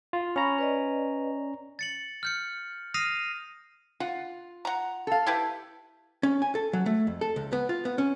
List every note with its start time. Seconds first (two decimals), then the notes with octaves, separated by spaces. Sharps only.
0.13 F4
0.36 C#4 A#5 B5 C#6
0.58 B4 D5 D#5
1.79 A6 C#7 F#7
2.23 F6 G6 C#7
2.94 D#6 F6 A#6 C7 D#7 F7
4.00 F4 F#5
4.65 F#5 A#5
5.07 A4 F5
5.26 E4 G4 B4
6.23 C#4
6.42 G#5
6.55 A4
6.73 F#3
6.86 A3
7.07 F2
7.21 A4
7.36 C#2
7.53 B3
7.69 F4
7.85 B3
7.98 C#4